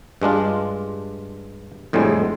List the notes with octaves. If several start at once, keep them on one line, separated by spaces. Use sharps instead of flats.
G2 G#3 D4 F4
F2 A2 D3 G3 G#3